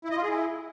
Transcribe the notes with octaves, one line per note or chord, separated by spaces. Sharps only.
E4
D#5
F4
G#4
E4